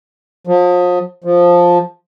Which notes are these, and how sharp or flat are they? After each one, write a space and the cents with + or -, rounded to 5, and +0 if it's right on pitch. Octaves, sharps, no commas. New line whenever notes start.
F3 +35
F3 +5